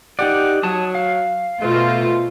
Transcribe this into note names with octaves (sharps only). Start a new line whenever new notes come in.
D#4 G4 D5 F#5
F#3 C#5 A5 D#6
F5
B2 A3 F4 C5